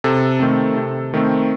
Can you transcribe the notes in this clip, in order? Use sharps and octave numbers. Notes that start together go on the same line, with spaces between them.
C3 A4
D#3 A3 C4
C3
D#3 A3 C4